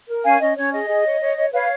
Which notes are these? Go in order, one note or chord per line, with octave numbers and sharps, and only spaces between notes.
A#4
C#4 F5 G#5
C#4 D#5
C#4 C#5
G#4 D#5
G#4
C#5
C#5
C#5
B4 C#5 F5